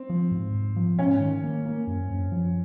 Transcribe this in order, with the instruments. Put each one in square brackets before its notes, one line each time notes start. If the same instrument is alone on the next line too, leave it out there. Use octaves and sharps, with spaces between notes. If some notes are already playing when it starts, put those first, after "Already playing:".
Already playing: [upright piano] C4
[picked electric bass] F3
G#2
G#2
F3
[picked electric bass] G#2 [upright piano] C#4
[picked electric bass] D#3
A#3
A#3
F#2
F#2
F3